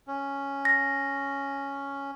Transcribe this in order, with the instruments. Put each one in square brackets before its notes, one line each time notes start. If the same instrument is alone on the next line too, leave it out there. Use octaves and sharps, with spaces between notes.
[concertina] C#4
[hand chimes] A#6